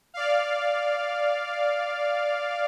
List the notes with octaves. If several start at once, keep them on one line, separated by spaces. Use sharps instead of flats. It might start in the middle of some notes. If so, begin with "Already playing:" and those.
D5 F5